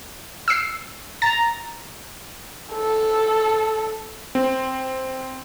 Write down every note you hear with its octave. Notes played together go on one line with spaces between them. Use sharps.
E6 C7
A#5 A6
A4
C4